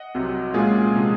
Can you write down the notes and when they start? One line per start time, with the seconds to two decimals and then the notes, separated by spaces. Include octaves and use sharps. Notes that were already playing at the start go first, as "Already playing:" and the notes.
Already playing: D#5 F#5
0.15 C2 C3 F#3 C4
0.54 A#2 G#3 C#4 F4 G#4
0.94 C3 F3 G#3